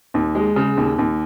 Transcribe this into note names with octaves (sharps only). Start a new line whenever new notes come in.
D#2
G#3
C#3
D#2
D#2